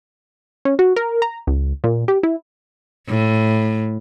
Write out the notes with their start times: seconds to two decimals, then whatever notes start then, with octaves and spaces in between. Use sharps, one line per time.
0.65 C#4
0.79 F#4
0.96 A#4
1.22 A#5
1.47 C#2
1.84 A#2
2.08 G4
2.23 E4
3.08 A2